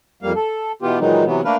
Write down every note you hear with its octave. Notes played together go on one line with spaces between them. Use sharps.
F2 G3 A#3 F5
A4
B2 E3 B3 F4 G4
A#2 D#3 E3 F#3 G#3 D#4
C3 E3 F#3 B3
A3 A#3 D4 A#4 B4